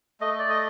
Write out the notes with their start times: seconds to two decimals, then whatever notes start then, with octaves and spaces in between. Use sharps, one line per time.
0.21 A3 D#5
0.39 D5
0.49 D#5